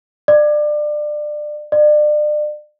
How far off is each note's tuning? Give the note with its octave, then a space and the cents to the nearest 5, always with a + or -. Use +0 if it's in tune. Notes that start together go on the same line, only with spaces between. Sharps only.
D5 +25
D5 +35